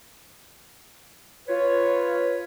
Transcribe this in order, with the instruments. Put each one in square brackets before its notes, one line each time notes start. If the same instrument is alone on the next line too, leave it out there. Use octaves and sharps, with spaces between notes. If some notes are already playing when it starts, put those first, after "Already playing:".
[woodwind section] F4 B4 C#5